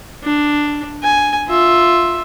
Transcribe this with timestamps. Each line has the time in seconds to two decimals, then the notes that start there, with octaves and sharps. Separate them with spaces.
0.24 D4
1.03 G#5
1.48 F4 E5